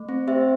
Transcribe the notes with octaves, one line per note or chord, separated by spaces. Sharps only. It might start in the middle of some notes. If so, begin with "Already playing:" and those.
Already playing: A3
C4
G4 C5 E5